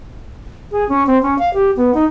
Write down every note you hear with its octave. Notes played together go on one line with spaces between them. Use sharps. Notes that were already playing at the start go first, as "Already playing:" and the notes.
G#4
C#4
C4
C#4
F5
G4
B3
D#4